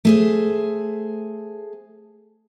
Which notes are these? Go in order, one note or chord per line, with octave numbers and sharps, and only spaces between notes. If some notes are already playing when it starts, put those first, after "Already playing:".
A3 G#4 C5